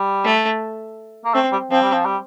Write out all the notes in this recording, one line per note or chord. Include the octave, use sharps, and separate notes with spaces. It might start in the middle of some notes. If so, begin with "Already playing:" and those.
Already playing: G3
A3
A#3
A3 C4
G3
F3 C4
G3
F3
G3